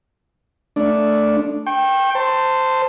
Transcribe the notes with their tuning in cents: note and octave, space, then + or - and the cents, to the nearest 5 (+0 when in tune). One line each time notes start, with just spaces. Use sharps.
A3 +0 D4 -5
G5 +0 C#6 -40
C5 -10 A5 +20